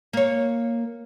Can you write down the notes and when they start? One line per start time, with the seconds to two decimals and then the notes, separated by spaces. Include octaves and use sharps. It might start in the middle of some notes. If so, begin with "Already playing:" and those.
0.13 A#3 C#5